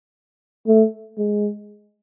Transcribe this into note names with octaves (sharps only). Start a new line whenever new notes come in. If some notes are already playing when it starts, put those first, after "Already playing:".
A3
G#3